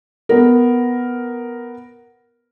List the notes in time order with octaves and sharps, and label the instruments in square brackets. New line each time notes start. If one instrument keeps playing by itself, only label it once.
[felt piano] B3 A#4